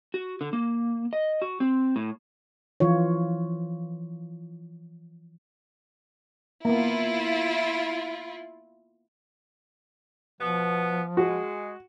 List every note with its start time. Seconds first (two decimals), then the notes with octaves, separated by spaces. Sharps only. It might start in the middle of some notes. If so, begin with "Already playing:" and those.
0.14 F#4
0.41 D3
0.53 A#3
1.13 D#5
1.42 F#4
1.60 C4
1.96 A2
2.80 E3 F3 F4 C#5
6.65 A#3 B3 E4 F4
10.41 B2 F3 B3
11.17 G#3 F#4